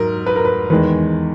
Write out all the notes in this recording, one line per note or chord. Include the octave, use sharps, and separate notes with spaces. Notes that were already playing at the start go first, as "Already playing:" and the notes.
Already playing: G#2 F#3 A#4
B4
A#4
B4
E2 D#3 G#3 B4